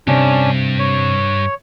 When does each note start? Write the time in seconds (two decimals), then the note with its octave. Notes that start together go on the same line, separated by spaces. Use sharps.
0.07 G2 C3 C#4 D4
0.79 C#5